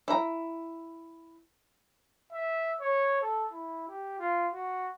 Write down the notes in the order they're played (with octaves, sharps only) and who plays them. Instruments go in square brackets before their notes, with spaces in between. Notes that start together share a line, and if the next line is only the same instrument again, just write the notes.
[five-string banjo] E4 A#5
[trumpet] E5
C#5
A4
E4
G4
F4
F#4